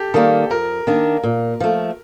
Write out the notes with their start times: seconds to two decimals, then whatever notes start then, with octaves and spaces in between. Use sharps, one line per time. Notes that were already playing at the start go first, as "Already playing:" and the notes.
Already playing: G4 A4
0.14 D#3 G3 A#3 A4
0.50 F2 A#4
0.87 D#3 A#3 D4
1.23 A#2
1.60 F3 A3